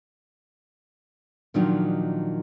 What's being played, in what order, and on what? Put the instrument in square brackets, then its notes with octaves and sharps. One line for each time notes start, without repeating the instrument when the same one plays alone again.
[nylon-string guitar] A#2 D#3 F3 F#3 D4 D#4